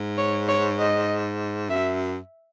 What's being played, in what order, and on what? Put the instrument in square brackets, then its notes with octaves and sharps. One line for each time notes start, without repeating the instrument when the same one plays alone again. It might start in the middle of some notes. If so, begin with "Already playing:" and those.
Already playing: [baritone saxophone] G#2
[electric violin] C#5
C#5
D#5
[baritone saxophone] F#2 [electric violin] E5